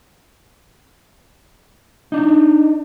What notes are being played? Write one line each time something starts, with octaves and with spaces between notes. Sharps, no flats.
D4 D#4